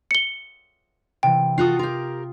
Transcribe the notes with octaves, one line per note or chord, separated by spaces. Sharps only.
C#7 G7
C3 E3 G5
F4 F#4 A4 D#6 C7
F4 G4 A#4